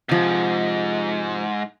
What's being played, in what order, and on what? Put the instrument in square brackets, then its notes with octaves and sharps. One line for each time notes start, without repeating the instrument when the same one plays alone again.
[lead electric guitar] G#2 [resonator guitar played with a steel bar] C3 F3